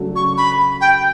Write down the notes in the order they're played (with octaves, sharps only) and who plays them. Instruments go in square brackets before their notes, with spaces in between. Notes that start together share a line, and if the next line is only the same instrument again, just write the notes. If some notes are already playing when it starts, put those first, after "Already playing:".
Already playing: [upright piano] C#3 F#3 A3 D4 F#4
[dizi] C#6
B5
G5